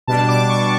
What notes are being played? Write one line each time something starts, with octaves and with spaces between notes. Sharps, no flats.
B2 G3 D4 A5
D6
C#6